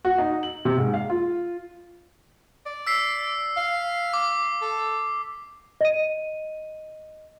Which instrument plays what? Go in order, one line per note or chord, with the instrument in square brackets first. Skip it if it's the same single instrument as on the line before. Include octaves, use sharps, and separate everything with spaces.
[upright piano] F#4
D#4
F#7
C3
G#2
F5
F4
[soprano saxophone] D5
[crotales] E6 B6 C7
[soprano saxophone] F5
[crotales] D6
[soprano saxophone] A4
[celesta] D#5 D#7